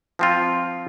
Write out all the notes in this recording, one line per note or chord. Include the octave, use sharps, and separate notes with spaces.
F3 C4 F4